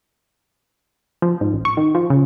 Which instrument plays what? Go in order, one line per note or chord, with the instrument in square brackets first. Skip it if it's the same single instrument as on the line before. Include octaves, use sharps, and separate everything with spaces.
[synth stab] F3
G#2
A1
C#6
D#3
F3
C#3